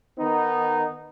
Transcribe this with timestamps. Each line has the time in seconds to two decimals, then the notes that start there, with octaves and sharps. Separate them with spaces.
0.19 D#3 B3 D#4